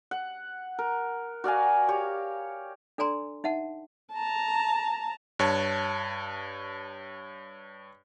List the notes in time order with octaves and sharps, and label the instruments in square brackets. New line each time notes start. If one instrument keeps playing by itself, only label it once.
[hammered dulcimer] F#5
A#4
F#4 D5 F5 G#5
G4 C#5
[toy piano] D4 A4 D5 G#5 A#5 C6
D#4 E5 F#5 A5
[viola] A5 A#5
[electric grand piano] G2 C#5 A5